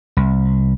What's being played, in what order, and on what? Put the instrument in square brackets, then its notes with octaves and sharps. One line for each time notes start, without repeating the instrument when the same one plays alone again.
[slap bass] C2